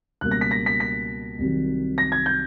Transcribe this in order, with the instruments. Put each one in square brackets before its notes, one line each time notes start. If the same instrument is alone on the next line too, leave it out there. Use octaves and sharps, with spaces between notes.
[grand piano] C#2 B2 G3 A#3 F#6
A#6
B6
A#6
B6
B6
C2 C3 D#3 F#3
A#6
G#6
G6